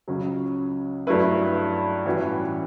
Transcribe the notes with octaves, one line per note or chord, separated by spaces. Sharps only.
C#2 C#3 F#3 C#4
G2 F#3 A3 E4 B4
A2 E3 G3 C#4 F#4